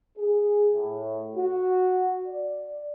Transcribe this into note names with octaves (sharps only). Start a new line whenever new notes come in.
G#4
A2
F#4
D5